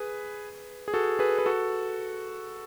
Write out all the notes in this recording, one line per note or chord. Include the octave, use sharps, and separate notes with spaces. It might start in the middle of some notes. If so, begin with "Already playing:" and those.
Already playing: G#4 B4
G#4
F#4 A4
G#4 B4
B4
F#4 A4